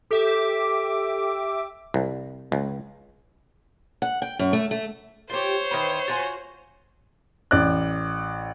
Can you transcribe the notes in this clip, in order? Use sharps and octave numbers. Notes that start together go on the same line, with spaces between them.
G4 A4 E5 D6
C2
C#2
F#5
G5
F#2
A3
A3
F4 G4 C5 C#5
D#3 E3 B4
F4 F#4 G#5
A1 D5 F#6